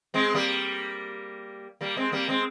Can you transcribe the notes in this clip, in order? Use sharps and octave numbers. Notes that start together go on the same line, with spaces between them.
G#3 C4
G3 A#3
G3 A#3
G#3 C4
G3 A#3
G#3 C4